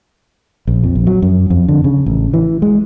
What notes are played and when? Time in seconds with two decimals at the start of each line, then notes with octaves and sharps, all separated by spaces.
0.67 A#1
0.84 F2
0.95 A#1
1.07 F#3
1.22 F#2
1.50 F2
1.68 D3
1.84 C#3
2.06 A1
2.34 E3
2.62 G#3